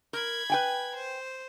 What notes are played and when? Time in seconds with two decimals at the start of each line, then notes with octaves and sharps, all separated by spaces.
0.13 A#4 B5 G#6
0.50 B4 G5 G#5
0.96 C5